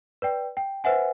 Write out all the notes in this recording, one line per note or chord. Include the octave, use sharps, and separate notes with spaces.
B4 D5 G5
G5
B4 C5 E5 F#5 G#5